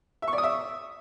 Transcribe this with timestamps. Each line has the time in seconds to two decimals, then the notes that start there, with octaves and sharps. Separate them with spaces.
0.22 E5
0.28 C#6
0.33 D5
0.38 D#6
0.43 E5